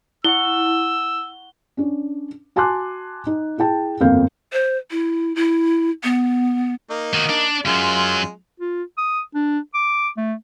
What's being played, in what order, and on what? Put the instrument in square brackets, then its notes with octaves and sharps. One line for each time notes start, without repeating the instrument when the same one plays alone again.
[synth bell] E4 [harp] F#5 C#6 C#7 [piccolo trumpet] E6 [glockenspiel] G7
[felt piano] C#4 D4
F#4 G#5 A5 C6 D6 F#6
D#4
E4 G#4 G5 A5
G1 F2 A#3 C4 F5 G6
[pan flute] C5
E4
E4
B3
[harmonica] A#3 D#4
[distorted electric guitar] D#3 F#4
D4
[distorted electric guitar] F#2 F#3 [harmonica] G#3 F4
[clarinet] F4
D#6
D4
D6
A3